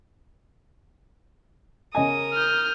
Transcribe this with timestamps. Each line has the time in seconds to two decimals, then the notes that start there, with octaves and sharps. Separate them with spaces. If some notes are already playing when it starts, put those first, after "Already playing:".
1.95 C#3 A#4 D#5 G#5 D#6
2.34 F6 G6